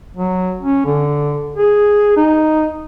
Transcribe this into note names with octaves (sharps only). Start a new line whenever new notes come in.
F#3
C#4
D3
G#4
D#4